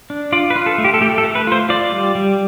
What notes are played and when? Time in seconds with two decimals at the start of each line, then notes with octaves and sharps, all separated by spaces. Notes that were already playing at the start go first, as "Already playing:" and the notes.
0.10 D4
0.32 F4 D5
0.50 B4
0.56 F4
0.66 A4
0.78 A3
0.84 G4
0.94 A4
1.01 A3 G4
1.18 A4
1.24 A3
1.35 B4
1.47 F4 C5
1.69 F4 D5
1.92 G3
2.15 G3